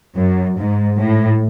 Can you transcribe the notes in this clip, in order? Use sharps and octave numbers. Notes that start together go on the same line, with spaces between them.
F#2
G#2
A2